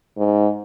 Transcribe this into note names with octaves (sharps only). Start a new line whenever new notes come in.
G#2